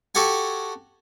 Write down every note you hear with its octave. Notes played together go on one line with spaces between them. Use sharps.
F#4 G4 A4 F#5 G#5